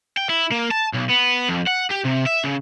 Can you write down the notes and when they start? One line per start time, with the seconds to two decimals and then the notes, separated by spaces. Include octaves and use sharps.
0.17 G5
0.29 E4
0.51 A#3
0.71 A5
0.93 B1
1.09 B3
1.48 F2
1.67 F#5
1.90 G4
2.04 C3
2.26 E5
2.44 C#3